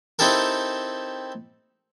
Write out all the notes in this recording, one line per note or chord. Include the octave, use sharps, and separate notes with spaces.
C4 D#4 E4 G4 A4 A#4